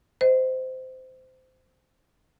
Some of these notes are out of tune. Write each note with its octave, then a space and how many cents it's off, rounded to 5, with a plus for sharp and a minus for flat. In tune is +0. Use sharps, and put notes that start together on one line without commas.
C5 -20 D#5 +20